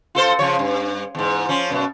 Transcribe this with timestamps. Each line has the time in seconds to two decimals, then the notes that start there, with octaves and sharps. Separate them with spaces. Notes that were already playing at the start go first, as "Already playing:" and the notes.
0.15 F4 A4 C5
0.39 C#3 F3 C#5
0.59 G2
1.15 E2 G#2
1.49 F3 C#4
1.70 F#2 B2